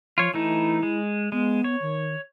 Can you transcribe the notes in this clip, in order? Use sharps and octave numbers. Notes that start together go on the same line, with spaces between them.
F3 F4 C#5
E3 A3 D#4 E4
G#3
G#3 B3
C#5
D#3